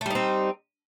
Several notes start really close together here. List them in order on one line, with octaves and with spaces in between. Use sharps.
A3 G3 D#4 C4